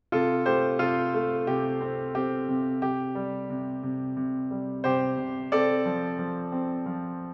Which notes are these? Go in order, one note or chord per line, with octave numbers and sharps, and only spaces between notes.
C3 F4 A4
A3 G4 C5
C3 F4 A4
A3
C3 G4
C4
C4 G4
C3
C3 G4
G3
C3
C3
C3
G3
C3 G4 C5
C3
C4 A4 D5
F3
F3
C4
F3